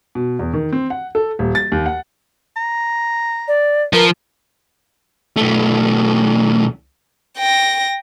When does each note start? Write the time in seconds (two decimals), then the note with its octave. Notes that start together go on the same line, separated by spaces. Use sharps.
0.15 B2
0.39 E2
0.54 D#3
0.73 C4
0.90 F#5
1.15 A4
1.39 D#1
1.55 A6
1.72 D#2
1.86 F#5
2.56 A#5
3.48 D5
3.93 F3 A#4 B4
5.37 B1 A3
7.38 G5 A#6